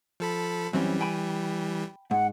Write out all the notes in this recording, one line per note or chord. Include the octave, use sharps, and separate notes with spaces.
F3 A4 B5
F#2 E3 G3 C4 C#4
G5 G#5 B5
G#2 F#5